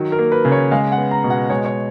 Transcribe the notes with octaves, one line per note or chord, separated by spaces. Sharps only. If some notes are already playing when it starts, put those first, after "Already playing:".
Already playing: D#3 F#3
A#4
A#3
B4
C#3
C#5
G#3 F5
F#5
B3
A#5
B2
F#5
G#3 C#5
C#5